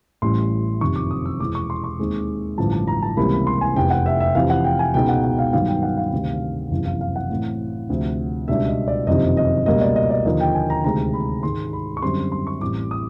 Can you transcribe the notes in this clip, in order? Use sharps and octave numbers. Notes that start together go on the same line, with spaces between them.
A1 A2 E3 G3 C6
F#1 F2 C3 D#3 C#6
D6
D#6
E6
E2 B2 G#3 D6
C#6
C6
C#6
D#2 D#3 G#3 C4
A1 G2 D3 F3 A5
A5
A#5
A5
C#2 C3 E3 G3 A#3 B5
B5
C6
G#5
F1 E2 C3 G5
F#5
E5
E5
F2 C3 E3 F5
F#5
G5
G#5
C#2 B2 G#3 B3 D#4 G5
F#5
F#5
F5
G2 D#3 F#3 B3 D#4 F5
G5
F#5
F5
D2 C3 D#3
F#1 F2 C3 E3
F5
F5
F#5
A2 E3 A3 C4
D2 C3 F3
C#2 B2 G3 B3 D4 E5
D#5
D5
F#1 F2 C3 D#3 D#5
D#5
C#2 B2 G3 A#3 D#5
D5
D#5
D5
D#2 D3 F3 A#3 D#5
G5
G#5
A#5
D2 C3 D#3 G#3 A#5
B5
G#2 D#3 G#3 C6
B5
C#6
F#2 D3 G3 C4 C6
C6
C#6
A1 A2 E3 G3 C4 D6
D#6